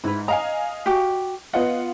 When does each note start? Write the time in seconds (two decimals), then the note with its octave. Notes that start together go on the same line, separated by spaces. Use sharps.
0.04 G#2 E4 B4
0.28 D#5 F5 G#5 A#5
0.86 F#4 G4
1.53 B3 F4 D#5 F#5